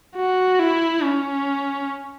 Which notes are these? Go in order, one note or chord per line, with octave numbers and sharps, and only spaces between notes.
F#4
E4
C#4